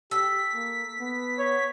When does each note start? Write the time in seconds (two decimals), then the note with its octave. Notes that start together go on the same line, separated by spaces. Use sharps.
0.11 G4 A4 B6
0.54 A#3
1.01 B3
1.39 C#5